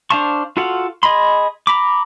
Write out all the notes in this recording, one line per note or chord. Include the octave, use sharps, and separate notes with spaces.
D4 C5 F5 A5 C#6
F4 F#4 A4 F5 F#5
G#4 D#5 B5 C6
A#5 B5 D6